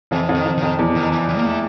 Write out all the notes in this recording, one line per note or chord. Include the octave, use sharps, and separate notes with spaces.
F2 E3
F2
D#3
F2
D#3
F2
E2
D#3
E3
E3
A#3
A3